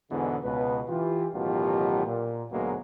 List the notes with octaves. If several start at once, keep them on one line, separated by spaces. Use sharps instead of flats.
E2 G#2 B2 D3 E3
C#2 B2 B4
E3 F4 G4
A1 B2 D#3 F#3 F4 G4
A#2
D2 G#2 B2 F#3 G#3 A#3